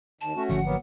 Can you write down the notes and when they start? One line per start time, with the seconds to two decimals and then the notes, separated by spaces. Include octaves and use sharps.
0.21 D#2 A5
0.36 A3 C#4 F#4
0.49 G#1 D3 F3 F#5
0.65 F#3 A#3 B3